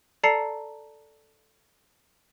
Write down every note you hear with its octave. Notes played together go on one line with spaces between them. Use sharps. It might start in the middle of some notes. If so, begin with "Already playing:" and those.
A4 D5 A5 A#5 C7 C#7